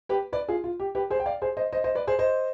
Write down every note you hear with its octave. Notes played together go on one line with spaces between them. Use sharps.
G4 B4
B4 D5
F4 G#4
F4
G4
G4 B4
G#4 C5
G5
D5 F5
G#4 C5
C5 D#5
C5 D#5
C5 D#5
B4 D5
G#4 C5
C5 D#5